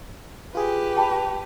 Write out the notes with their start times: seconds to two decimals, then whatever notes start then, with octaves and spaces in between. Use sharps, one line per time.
0.55 F4 G4 G#4 B4
0.97 G5 A5 B5